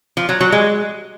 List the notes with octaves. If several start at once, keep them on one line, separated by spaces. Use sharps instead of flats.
F3
F#3
F#3
G#3